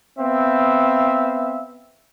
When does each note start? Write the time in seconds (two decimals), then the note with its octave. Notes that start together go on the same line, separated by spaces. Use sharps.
0.19 B3 C4 E5 F5